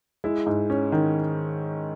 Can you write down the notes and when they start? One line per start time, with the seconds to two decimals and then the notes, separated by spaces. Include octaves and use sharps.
0.24 G#3 E4
0.46 G#2
0.70 C#4
0.92 D#3